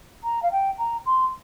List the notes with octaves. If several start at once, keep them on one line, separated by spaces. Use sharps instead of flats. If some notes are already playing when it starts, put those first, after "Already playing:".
A#5
F5
G5
A#5
C6